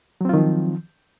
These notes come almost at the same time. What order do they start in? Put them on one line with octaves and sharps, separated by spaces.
F#3 C4 F4 D#3 F3